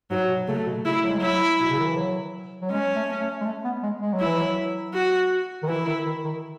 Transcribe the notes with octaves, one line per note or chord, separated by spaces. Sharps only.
G#2 F#3
B2
C#3 A3
B2
C#3 E4
F#3
G#3
F#3 E4
B2
C#3
D#3
E3
F#3
F#3
G#3 C#4
A3
A3
G#3
A3
B3
G#3
G#3
F#3
E4
E3
F#3
F#4
D#3
E3 E4
D#3
D#3
D#3